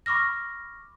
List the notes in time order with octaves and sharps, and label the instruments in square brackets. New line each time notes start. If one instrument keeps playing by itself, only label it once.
[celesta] B5 C#6 D6 F6 A#6